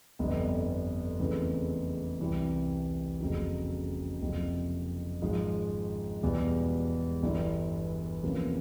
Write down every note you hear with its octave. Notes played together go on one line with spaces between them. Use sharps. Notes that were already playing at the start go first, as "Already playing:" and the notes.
G1 F2 D3 G3 B3
E2 C#3 E3 A3 C4
C2 C3 E3 G3
F#1 F2 C#3 F#3
F#1 F2 C3 F3
G#1 G#2 F3 G#3
E1 E2 B2 G3
G1 G2 E3 G3
E2 C3 F3 A#3 C#4